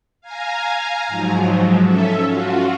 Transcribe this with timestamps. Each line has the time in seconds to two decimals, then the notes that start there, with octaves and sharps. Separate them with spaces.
0.21 F5 G#5 A#5
1.08 G#2 F3 F#3
1.85 C#4 A4 E5
2.25 F4 F#4